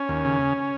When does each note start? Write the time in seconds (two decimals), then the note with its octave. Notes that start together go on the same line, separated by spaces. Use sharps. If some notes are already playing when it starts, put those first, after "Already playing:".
Already playing: C#4
0.09 D#2
0.25 C#3